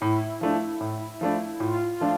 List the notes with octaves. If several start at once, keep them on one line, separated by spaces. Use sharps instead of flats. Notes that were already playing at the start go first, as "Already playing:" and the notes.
A2 E4
F3 A3 D4
A2
F3 A3 D4
A2 F4
F3 A3 D4 F4